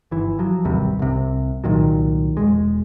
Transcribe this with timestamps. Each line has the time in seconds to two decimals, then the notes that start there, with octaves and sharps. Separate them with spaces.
0.11 G1 E3
0.39 F3 F#3
0.65 A1 D#2 C3 G3
0.99 C2 C3
1.64 C2 A#2 D#3 F#3
2.37 E1 G#3